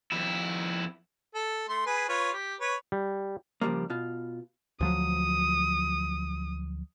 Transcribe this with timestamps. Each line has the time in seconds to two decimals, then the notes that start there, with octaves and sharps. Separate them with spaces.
0.12 F2 E4
1.35 A4
1.69 A3 C6
1.86 G#4 B4
2.09 F4 B4 C#5
2.33 G4
2.61 B4 C#5
2.92 G3
3.61 C#3 F3 G3 G#3 A#3
3.90 B2 F4
4.81 D2 F3 F#3 D#6